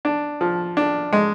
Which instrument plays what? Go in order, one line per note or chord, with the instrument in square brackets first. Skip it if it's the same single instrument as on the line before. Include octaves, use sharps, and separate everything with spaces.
[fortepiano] D4
F3
D4
G#3